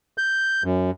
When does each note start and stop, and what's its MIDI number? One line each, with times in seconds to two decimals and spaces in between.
0.18 0.63 91
0.64 0.91 42